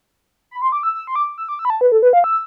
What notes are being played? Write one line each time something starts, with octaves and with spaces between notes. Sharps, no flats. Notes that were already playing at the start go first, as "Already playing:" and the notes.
B5
C6
D6
E6
E6
C6
D6
E6
D6
E6
B5
A5
B4
A4
B4
F5
E6